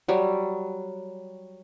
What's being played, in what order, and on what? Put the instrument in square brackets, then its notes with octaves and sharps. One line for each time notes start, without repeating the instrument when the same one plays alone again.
[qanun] F#3 G3